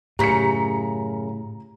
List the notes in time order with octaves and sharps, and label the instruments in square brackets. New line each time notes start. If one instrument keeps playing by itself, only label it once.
[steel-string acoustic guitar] F#2 C#3 [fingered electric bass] A2 [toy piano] G4 [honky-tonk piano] A#5 B6 C#7